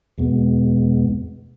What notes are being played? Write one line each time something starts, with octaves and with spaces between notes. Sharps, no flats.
E2 B2 G#3 B3